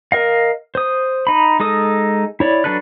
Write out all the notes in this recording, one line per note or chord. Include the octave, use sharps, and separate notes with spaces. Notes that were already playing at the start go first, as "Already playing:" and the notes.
A#4 D#5 F5
C5 D#6
D#4 B5
G#3 D#4 A4 D#6
E4 C#5 D5
F#3 D4 A4 B4 F#6